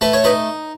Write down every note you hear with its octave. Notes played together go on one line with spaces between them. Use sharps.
A3 B4
C#5
D#4 B4